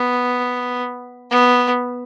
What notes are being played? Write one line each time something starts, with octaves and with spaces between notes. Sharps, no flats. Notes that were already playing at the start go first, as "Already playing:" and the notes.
Already playing: B3
B3